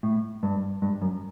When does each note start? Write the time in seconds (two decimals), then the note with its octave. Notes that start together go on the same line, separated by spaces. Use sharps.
0.03 A2
0.43 G2
0.82 G2
1.02 F#2